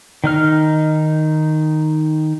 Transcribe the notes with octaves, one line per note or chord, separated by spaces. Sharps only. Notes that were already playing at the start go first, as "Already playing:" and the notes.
D#3 D#4 F6